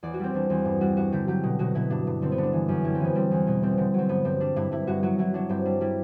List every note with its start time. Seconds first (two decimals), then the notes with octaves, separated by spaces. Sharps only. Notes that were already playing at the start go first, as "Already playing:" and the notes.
0.03 E2 D5
0.14 F#4
0.19 G3 C4
0.34 E2 D4
0.50 E2 C4
0.65 G2 D4
0.81 G3 F#4
0.97 G2 F#4
1.12 D3 G4
1.28 F#3 G4
1.43 B2
1.59 B2 F#4
1.75 B2 E4
1.90 G2 D4
2.07 G2
2.22 D3 C4
2.32 B3
2.38 D3
2.43 D4
2.53 E3
2.68 F#2
2.84 G3 E4
2.95 C4
3.00 E3 B3
3.15 G3 C4
3.31 E2
3.47 B2 B3
3.62 G3 C4
3.78 D3 C4
3.94 F#3 C4
4.09 G2 B3
4.25 G2 C4
4.40 G3 D4
4.56 G2 E4
4.72 G2 E4
4.87 G2 F#4
5.03 F#3 F#4
5.19 F#3 E4
5.34 F#3 D4
5.49 G2 C4
5.65 G3 D4
5.81 G3 E4